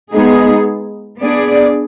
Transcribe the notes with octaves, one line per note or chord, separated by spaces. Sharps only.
G#3 B3 D#4 G#4
B3 D4 G#4 D5